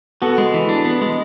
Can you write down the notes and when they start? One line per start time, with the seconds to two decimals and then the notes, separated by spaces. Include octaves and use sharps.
0.22 B3 F#4 A4
0.38 G#3
0.54 E3
0.69 D4
0.85 B3
1.01 G#3